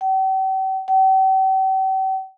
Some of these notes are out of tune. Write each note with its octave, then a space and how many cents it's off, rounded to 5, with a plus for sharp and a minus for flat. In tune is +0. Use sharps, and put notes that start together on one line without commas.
G5 -45
G5 -45